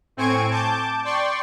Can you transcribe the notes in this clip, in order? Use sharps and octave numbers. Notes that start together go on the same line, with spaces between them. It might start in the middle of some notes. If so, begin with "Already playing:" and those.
A2 C4 G#5 C#6 G#6 D7
A5 D6 G6
D5 G5 C6 C#6